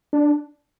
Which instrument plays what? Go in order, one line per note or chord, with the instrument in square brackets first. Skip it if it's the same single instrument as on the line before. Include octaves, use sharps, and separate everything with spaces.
[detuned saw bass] D4